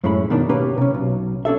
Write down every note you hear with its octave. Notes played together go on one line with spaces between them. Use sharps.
F#2 A2 G#3 C#4 E4 B5
B2 D#3 D4
B2 A#3 C#4 G4 B4
C3 C#4
B1
C#4 D4 A4 E5